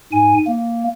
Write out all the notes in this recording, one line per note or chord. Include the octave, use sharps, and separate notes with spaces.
G#2 G#5
A#3